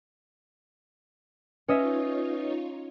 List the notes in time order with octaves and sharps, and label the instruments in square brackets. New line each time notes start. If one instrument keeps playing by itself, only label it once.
[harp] C#4 D#5 E5 [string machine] D#4 F4 C#5 [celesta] B4 D#6